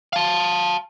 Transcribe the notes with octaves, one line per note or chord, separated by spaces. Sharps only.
F5 A5